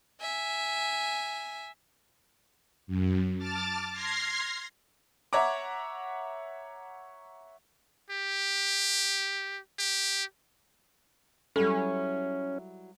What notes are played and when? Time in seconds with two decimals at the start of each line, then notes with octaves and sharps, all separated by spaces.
0.20 E5 G#5
2.87 F#2
3.38 A5 D6 F6 A6
3.92 C6 F6 G#6 A#6 C7
5.33 C#5 E5 F#5 A#5 D6
8.10 G4
9.79 G4
11.56 F#3 G3 C#4 E4 A4